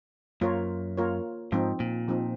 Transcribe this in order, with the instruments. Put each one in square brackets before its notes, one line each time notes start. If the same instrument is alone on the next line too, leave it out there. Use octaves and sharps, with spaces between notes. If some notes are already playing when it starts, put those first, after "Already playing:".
[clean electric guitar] F#2 [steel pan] A#3 F4 A#4 C#5
[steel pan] A#3 F4 A#4 C#5
[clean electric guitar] G#2 [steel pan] F3 C4 D#4
[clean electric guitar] A#2
[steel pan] F3 C4 D#4